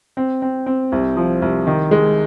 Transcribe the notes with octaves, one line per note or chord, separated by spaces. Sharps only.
C4
C4
C4
C2
F3
C2
D#3
G#3